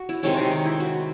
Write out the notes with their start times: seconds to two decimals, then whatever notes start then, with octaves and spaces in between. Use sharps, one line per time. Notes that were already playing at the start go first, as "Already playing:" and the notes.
Already playing: F#4
0.09 E4
0.23 C3 D#3 G#3 C#4 E4
0.38 D#4
0.52 D#4
0.65 E4
0.80 F#4